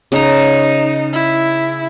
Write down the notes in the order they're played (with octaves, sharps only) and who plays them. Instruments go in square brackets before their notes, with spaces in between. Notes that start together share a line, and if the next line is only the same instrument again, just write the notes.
[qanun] C#3 A#5 [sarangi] D#4
[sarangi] E4